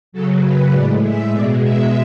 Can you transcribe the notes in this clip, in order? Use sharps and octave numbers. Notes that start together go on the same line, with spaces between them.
C#3 F#3 A4
B4
A2 G#3 D5
E5
B2 G#3 D5
E5